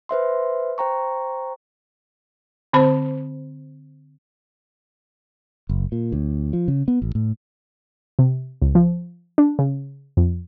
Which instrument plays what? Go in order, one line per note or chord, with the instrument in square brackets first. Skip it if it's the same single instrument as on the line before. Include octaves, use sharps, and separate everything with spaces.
[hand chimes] B4 C5 E5 C6
C5 G5 A#5 C#6
[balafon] D3 C4 C5 B5
[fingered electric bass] F#1
A#2
D2
F3
C#3
B3
A1
A2
[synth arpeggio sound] C3
C#2
F3
D4
C#3
F2